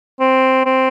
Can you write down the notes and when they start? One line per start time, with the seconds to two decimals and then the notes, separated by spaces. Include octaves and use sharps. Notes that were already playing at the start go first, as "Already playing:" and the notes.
0.20 C4
0.65 C4